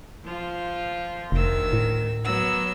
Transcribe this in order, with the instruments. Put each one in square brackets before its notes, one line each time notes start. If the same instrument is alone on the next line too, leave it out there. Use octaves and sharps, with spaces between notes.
[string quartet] F3 F4
[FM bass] F1 [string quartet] D2 D#3 E6
[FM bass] A2
[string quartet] F#3 B3 E6